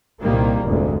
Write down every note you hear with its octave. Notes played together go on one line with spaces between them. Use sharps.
C2 A#2 D#3 G3 A#3
F1 D2 G#2